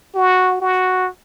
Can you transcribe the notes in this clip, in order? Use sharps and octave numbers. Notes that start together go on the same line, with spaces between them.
F#4
F#4